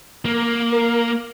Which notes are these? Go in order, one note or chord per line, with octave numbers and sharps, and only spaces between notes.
A#3 A#4
A#4